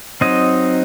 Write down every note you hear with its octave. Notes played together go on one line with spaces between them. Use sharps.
F#3 C4 D#4 D#5